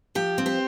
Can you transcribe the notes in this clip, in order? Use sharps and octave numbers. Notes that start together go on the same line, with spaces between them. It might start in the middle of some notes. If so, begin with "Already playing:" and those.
F3 G4
C4
G4 C5